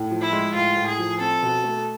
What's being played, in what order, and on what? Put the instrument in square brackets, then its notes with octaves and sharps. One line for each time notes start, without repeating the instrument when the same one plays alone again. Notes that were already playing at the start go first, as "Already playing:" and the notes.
Already playing: [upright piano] A2
F3
[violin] E4
[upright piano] G#3
[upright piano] A2 [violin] F4
[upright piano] A2
[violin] G#4
[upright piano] F3
[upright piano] C4 [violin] A4
[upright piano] B2
A3